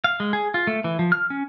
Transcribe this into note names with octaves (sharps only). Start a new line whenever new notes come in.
F5
G#3
G#4
F4
A3
E3
F3
F6
C#4